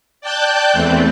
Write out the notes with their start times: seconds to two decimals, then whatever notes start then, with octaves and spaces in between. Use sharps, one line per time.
0.21 D5 G5 A5 F#6 G6
0.73 E2 E3 A3 C4